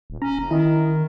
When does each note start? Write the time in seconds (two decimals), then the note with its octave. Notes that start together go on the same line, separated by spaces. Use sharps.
0.10 D#1
0.22 C#4 A#5
0.39 F#1
0.51 D#3 E4 D#5 A#5